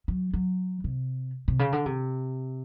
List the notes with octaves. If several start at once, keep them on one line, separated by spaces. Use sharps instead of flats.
F#3
F#3
C3
C3
C#3
D3
C3